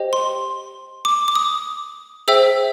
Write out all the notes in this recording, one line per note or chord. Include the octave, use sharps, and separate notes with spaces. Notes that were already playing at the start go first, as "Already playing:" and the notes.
Already playing: G4 C5 D#5 G5
C6
D6
D6
D#6
G#4 C5 E5 G5 E6